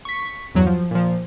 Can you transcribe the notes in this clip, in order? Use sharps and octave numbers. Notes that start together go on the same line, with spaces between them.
C#6 B6
E2 G2 F#3
F3
A#2 F3